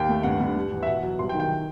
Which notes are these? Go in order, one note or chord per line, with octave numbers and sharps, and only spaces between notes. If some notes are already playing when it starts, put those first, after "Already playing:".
Already playing: D#2 G5
A3
G2 F#5
G2
G3
E2
E5
B2 F#5
F#3
C2 C6
G5
D#3
G5